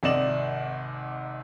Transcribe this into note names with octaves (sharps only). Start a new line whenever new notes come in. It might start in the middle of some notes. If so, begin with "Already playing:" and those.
G#1 C3 D5 D#5 E7 F#7